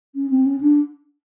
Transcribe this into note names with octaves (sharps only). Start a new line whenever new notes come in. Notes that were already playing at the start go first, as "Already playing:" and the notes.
C#4
C4
C#4
D4